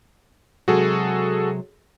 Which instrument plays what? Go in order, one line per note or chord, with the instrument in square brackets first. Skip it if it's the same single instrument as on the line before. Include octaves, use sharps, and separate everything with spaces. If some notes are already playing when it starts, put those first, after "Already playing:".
[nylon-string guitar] C3 F#3 G#3 [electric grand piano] F#4 G#4 A4